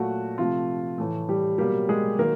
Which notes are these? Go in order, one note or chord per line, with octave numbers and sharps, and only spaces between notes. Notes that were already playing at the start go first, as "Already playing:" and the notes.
Already playing: A#2 F#3 A3 F#4
C3 F3 A3 F4
A2 E3 A3
G3 G4
B2 F#3 G3 A#3 G4
G#3 G#4
D#3 F#3 A#3 A#4